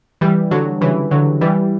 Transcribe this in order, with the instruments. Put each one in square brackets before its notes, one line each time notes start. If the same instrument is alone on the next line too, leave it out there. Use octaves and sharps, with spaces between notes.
[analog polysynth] E3 G3
D3 F#3
C#3 E3
D3 F#3
E3 G3